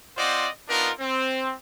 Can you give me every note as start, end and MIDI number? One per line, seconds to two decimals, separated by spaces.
0.18 0.48 60
0.18 0.48 65
0.18 0.48 72
0.18 0.48 74
0.18 0.48 75
0.18 0.48 78
0.68 0.90 59
0.68 0.90 62
0.68 0.90 63
0.68 0.90 65
0.68 0.90 70
1.00 1.53 60